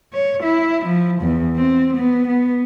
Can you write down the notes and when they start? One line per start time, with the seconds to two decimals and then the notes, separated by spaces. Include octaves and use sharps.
0.13 C#5
0.43 E4
0.86 F3
1.22 E2
1.57 C4
1.97 B3
2.28 B3